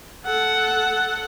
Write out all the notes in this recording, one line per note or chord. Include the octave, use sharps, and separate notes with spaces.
A4 F#5